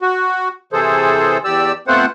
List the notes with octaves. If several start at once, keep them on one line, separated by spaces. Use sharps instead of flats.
F#4
C3 E3 G#4 A4 C5
E2 G4 D5 E6
A3 B3 C4 F4 C5 F#5